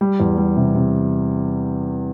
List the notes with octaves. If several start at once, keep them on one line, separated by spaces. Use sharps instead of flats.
G3
E2
G3
C3
C3